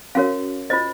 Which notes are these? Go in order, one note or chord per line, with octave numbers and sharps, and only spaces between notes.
C#4 F#4 A#4 C#5 F5
F4 C5 D#5